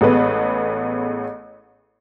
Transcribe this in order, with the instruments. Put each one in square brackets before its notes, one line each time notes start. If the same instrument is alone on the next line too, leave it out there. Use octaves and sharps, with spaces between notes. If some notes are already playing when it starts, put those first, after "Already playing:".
[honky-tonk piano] A1 G#3 A3 B3 B4